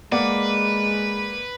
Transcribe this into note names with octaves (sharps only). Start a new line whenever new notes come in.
G#3 A#3 B4 D5 F#5